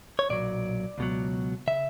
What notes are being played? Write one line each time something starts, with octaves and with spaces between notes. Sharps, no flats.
C#5
B1 A#2 F#3 D5
C#2 B2 F#3
C#3 E5